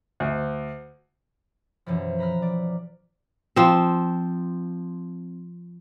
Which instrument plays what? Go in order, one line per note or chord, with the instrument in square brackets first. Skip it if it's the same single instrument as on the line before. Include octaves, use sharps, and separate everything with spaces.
[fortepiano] D2
[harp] F#2 B2 E3 F3
B4 A#5 B5 F6
D5
[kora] F3 C4